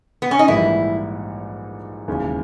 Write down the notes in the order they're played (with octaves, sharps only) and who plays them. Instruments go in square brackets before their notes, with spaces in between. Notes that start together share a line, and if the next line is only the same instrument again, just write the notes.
[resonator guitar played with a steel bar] B3
C#4
D#4
[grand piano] A#1 G#2 E3 G3 A#3 [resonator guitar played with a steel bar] E4
[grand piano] E1 D#2 C#3 G#3 C#4